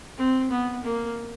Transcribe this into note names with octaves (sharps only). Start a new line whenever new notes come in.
C4
B3
A#3